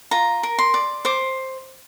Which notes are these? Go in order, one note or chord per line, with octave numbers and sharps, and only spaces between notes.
F4 A#5
A#4
C6
D5
C5 D6